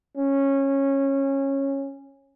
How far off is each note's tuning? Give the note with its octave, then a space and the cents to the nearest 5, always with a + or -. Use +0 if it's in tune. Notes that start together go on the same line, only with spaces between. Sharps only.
C#4 -15